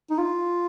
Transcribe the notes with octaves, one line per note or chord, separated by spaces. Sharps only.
D#4
F4